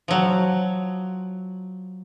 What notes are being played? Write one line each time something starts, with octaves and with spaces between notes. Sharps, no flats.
F3 F#3